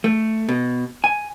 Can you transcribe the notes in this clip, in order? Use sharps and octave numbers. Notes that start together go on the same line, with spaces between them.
A3
B2
G#5